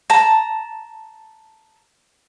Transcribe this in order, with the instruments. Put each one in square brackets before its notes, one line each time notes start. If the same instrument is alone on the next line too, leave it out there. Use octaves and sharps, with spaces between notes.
[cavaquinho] A5 A#5